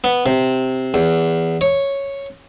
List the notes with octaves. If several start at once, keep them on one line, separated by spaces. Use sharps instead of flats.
B3
C3
E2
C#5